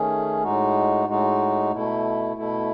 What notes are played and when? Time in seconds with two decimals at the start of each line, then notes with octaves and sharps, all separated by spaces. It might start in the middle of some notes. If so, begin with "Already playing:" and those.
Already playing: D#3 A3 C#4 G#4
0.43 A2 G#3 D#4 F#4
1.07 A2 G#3 D#4 F#4
1.71 B2 A3 E4
2.36 B2 A3 E4